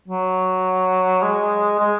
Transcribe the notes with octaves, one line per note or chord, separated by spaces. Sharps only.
F#3
G#3
G#3